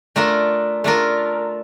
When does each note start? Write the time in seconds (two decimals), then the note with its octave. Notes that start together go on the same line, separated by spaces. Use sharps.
0.16 A3 D4 F4 A#4
0.84 A3 D4 F4 A#4